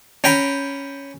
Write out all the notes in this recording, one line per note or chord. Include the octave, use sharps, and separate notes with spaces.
C#4 G5 A#5 B5